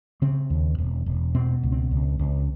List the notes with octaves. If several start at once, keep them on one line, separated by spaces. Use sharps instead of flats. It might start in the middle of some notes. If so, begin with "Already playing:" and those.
C#3 C4
D#2
E1
E1
B2 C4
C#2
C4
C#2
C#2